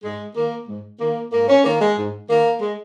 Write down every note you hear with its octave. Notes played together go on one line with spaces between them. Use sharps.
G#2 G#3
D#3 A#3
G#2
D#3 A#3
G#2 A#3
C#4
D#3 A#3
G#3
G#2
D#3 A#3
G#3